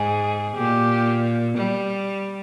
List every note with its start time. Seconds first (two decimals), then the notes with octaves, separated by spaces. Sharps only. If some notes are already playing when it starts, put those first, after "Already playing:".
Already playing: G#2 G#4
0.56 A#2 G4
1.57 G3